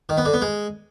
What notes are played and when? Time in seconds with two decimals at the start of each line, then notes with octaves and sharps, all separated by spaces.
0.09 D#3
0.17 B3
0.25 D3
0.33 B3
0.41 G#3